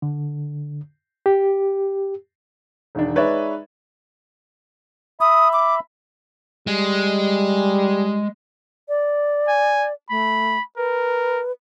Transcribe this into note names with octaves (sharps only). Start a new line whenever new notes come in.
D3
G4
E1 D#3 D4
G#3 D#4 B4 C#5 D5 E5
E5 B5 D#6
D6
G3 G#3
D5
G#5
A3 B5
A#4 B4